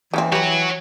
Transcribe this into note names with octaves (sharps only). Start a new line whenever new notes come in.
C#3 E3 A#3 C4
F#4 G4 B4 C#5